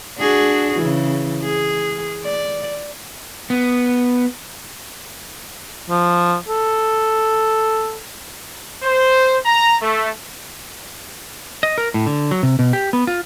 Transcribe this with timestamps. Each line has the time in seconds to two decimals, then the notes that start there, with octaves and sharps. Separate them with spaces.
0.18 D4 F#4 G#4
0.78 C#3 E3
1.43 G#4
2.25 D5
3.50 B3
5.90 F3
6.48 A4
8.83 C5
9.45 A#5
9.81 A3
11.63 D#5
11.78 A#4
11.94 A2
12.06 D3
12.31 F#3
12.43 C3
12.59 B2
12.73 G4
12.93 B3
13.07 F4